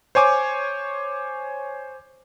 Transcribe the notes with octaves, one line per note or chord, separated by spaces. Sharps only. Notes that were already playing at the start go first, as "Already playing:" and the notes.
C5 C#5 G#5 D6